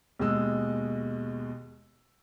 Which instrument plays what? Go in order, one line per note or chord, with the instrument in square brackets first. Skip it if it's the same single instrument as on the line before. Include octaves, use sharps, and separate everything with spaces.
[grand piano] D#2 B2 G#3 E6